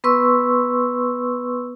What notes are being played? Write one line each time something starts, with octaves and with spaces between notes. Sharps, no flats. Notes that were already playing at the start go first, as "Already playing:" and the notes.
B3 B4 C6 C#6 E6